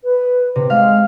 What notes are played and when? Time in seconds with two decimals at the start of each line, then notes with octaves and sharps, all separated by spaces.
0.04 B4
0.55 C3
0.70 G#3 F5